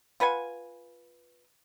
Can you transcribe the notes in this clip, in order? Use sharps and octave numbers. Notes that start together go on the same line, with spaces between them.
F4 B4 F#5 G#5